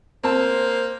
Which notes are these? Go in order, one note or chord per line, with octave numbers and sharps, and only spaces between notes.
A#3 C4 C5 A5